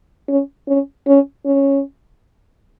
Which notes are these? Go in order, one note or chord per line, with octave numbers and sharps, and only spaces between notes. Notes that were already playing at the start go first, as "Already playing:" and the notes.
C#4
C#4
C#4
C#4